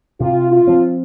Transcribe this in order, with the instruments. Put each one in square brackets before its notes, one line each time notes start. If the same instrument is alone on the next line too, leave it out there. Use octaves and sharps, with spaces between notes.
[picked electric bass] C3 [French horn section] F4
[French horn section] F4
[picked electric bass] F3 C4